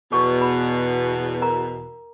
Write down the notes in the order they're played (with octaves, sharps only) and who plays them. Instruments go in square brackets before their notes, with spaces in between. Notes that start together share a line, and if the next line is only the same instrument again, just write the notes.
[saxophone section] E2 B2 [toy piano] A4 C#6
[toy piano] B5
A#4 A#5